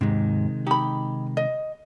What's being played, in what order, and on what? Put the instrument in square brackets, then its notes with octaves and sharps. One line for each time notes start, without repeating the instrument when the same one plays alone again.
[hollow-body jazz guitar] D#2 G#2 [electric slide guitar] C3 D#3 G#3
[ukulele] D#4 B5 [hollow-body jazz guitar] G4
[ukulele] D#5